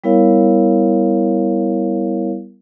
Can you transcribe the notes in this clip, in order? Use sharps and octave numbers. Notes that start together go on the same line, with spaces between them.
G3 B3 E4 A#4 C#5 F5